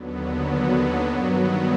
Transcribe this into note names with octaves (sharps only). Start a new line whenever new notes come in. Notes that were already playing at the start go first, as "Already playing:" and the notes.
Already playing: D#2 D3 F#3 B3
G2 D#3 F#3 B3